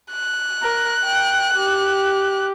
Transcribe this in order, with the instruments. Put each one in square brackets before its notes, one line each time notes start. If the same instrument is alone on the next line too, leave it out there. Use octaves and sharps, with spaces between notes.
[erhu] F#6
[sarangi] A#4
G5
G4